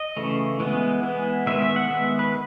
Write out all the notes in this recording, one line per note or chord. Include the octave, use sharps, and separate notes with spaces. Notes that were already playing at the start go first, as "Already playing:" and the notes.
Already playing: D#5
C#3 E3 A3
E3 G#3 B3
E3 G#3 B3
D#3 G#3 B3 E5
E5
F#5
D#3 G#3 B3 E5
B4